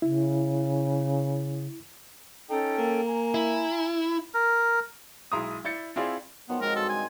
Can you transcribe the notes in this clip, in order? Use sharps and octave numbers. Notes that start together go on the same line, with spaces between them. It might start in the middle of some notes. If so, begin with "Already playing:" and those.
C#3 E4
C#4 D#4 A4 G5
A#3
G#5 A#5
E4
A#4
B1 G#3 E4 A#5 C6 D#6
E4 D5 G6 A6 C#7
C4 E4 F4 G#4 D5
D#3 F3 F#3 B3
G#3 C4 F#4 A#4
G2 C4 A4
G#5